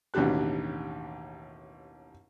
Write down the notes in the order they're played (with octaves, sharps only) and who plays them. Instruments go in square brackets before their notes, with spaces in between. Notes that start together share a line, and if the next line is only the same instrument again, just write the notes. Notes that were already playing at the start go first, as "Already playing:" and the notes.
[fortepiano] A1 D#2 B2 D4 G4 F#6